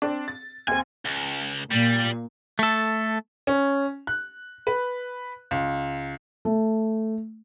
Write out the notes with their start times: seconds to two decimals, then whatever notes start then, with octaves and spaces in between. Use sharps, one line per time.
0.02 C4 D4
0.28 A6
0.68 D#2 C4 G#5
1.05 C#2
1.71 A#2 G3
2.59 A3 A4
3.47 C#4
4.07 F#6
4.67 B4
5.51 C#2
6.45 A3